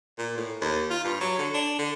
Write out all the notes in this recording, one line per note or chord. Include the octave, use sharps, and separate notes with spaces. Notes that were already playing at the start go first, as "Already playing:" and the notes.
A#2
A2
D#2
F4
G2
F#3
D3
D4
D3